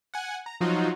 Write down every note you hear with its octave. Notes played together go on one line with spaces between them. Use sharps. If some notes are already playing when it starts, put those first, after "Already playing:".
F#5 G#5
A#5
F3 F#3 D#4 F4 F#4